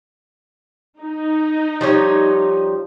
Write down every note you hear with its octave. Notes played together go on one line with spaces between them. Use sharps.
D#4
F3 G3 C#5